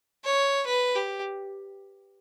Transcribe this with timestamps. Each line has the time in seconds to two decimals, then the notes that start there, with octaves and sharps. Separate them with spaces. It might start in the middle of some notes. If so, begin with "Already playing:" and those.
0.24 C#5
0.67 B4
0.95 G4